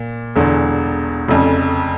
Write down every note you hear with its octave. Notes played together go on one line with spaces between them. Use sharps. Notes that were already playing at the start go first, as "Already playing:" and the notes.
Already playing: A#2
E1 E2 D3
F1 F2 C#3